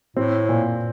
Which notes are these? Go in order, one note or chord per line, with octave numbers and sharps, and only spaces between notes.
A2 C4
A#2